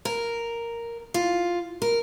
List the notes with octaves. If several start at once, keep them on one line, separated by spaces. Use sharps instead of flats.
A#4
F4
A#4